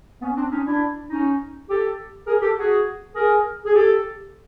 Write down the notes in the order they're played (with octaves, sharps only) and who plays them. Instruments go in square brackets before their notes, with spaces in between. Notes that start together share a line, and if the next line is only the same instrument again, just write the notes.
[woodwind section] B3 C#4
C4 D4
C#4 D#4
D4 E4
C#4 D#4
G4 A4
G#4 A#4
G4 A4
F#4 G#4
G#4 A#4
G#4
G4 A4